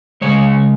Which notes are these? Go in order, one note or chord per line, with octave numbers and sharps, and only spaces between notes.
C#3 G#3 C#5